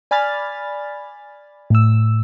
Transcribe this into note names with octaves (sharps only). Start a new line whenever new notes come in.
D5 G#5 B5 F6 A6
A2 E6